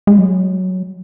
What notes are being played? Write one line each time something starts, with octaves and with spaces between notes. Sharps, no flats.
G#3
F#3